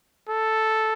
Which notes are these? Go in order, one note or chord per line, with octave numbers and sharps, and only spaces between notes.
A4